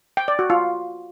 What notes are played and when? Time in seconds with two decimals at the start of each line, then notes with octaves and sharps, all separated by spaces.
0.17 G5
0.28 D5
0.39 F#4
0.50 F4